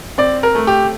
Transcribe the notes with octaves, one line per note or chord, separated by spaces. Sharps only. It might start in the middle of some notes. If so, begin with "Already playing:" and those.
C4 D5
A#4
A3
G4